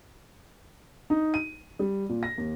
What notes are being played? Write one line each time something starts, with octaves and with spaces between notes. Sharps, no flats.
D#4
D#7
G3
A#2
A#6
D#2